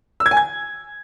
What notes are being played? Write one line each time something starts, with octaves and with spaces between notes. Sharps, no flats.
E6
G#6
G#5
G#6